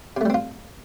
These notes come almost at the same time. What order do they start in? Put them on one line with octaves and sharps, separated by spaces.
C3 A3 G3 C4 F4